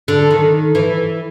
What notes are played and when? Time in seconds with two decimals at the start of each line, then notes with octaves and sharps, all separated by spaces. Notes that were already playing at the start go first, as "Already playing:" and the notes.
0.08 D3
0.31 D#3
0.75 E3